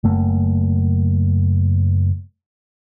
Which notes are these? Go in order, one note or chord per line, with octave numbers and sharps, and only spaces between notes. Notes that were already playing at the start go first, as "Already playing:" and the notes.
F#1 F#2 A3 A#3